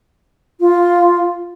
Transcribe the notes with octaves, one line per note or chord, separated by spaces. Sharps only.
F4